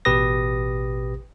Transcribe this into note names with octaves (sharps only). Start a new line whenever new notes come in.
A1 B2 G4 B4 D#6 A#6